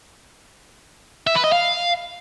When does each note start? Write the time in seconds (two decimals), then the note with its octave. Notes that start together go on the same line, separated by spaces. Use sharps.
1.27 E5
1.35 B4
1.44 D#5
1.52 F5